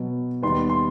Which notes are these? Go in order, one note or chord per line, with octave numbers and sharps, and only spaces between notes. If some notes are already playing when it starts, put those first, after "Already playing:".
Already playing: B2 F#3 B3
D#2 D#3 G3 B3 C6
C6